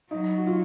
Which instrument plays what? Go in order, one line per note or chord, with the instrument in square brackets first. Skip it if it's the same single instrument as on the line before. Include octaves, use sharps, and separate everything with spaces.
[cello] F#3 [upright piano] D#4
[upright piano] F#4
F4